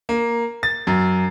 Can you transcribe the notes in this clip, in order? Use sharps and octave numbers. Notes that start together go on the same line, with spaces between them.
A#3
A6
F#2